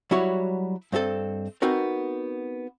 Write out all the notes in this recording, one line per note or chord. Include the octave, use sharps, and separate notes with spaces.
F#3 G3 E4 F#4 C#5
G2 C4 F#4 A4 D#5
B3 C4 D#4 F#4 A#4